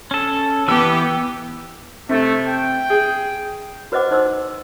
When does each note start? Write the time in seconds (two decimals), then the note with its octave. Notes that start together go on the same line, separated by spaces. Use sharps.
0.11 C#4 A4
0.68 E3 B3 G4 E6
2.09 C3 A3
2.47 G5
2.90 G#4
3.92 F#4 B4 C5 D#5 F#5 D6
4.11 D#4 C5 C6 E6